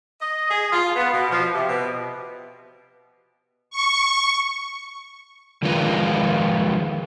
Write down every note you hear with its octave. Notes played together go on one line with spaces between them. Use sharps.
D#5
G#4
F4
B3
B2
F3
C3
B2
C#6
D#3 F3 G#3 F4 A#4 B4